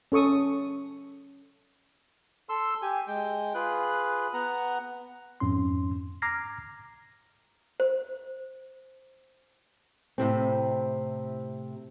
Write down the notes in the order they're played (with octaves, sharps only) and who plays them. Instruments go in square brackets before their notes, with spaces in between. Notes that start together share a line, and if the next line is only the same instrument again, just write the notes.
[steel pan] C#4 A4 C#6 D#6
[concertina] A4 C6 E6
G4 G#5
G#3 G5
F4 G#4 B4 F#6
B3 F#5 A#5
[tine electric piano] F2 G#2 C#4 C6
A#5 D6 F6 G#6 A#6 C7
[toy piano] C5
[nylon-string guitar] A2 C3 C4